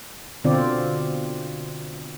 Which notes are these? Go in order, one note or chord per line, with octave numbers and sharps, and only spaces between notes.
B2 D3 C4 F4 D5